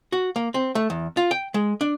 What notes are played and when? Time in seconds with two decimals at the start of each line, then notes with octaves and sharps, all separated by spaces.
0.12 F#4
0.36 A#3
0.54 C4
0.75 A3
0.90 E2
1.17 F4
1.31 G5
1.54 G#3
1.81 D4